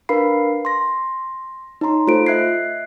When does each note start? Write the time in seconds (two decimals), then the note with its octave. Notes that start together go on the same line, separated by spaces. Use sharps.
0.09 D4 A#4 B4 F5 B5 C7
0.65 C6 A#6
1.81 D#4 C#5 A#5 C6
2.07 A3 F4 A4 C5 D7
2.26 D#5 E5 F#6 G#6 C7